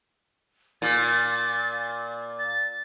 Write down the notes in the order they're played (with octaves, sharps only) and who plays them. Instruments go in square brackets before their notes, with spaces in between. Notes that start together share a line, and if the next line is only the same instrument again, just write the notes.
[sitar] A#2 [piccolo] A6
[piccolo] A6